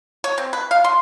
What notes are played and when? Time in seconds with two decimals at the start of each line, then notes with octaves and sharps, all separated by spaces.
0.24 C#5
0.38 C4
0.53 B4
0.71 F5
0.84 C6